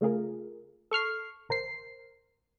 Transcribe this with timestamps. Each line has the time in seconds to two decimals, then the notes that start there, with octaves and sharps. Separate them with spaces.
0.01 C#3 A3 F4 G#4 A#4
0.91 A4 C#6 F6 C7
1.49 A1 A#4 C5 C7